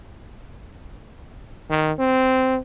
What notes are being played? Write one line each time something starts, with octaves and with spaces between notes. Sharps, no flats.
D#3
C4